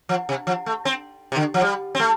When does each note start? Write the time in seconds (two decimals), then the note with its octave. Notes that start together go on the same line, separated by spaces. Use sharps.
0.09 F3
0.29 C3
0.47 F3
0.66 A3
0.85 C4
1.32 C3
1.36 D3
1.54 F3
1.62 G3
1.95 C4
2.00 A3